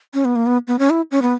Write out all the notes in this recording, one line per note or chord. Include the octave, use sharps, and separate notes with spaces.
C#4
B3
A#3
B3
B3
C#4
E4
C#4
B3